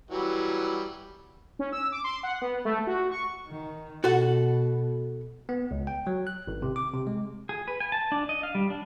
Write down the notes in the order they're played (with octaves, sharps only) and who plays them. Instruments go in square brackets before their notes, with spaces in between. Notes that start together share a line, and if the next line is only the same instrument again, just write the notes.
[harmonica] E3 F#3 G3
[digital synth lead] C#4
E6
D6
C6
F#5
B3
A3
F#4
C#6
[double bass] D#3
[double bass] B2 [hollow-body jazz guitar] F#4 A4 F#5
[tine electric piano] B3
C#2
G5
F#3
F#6
G#1
C3
D6
C3
G#3
[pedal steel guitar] G#4
B4
G#5
A5
D4
D#5
F5
G3
D4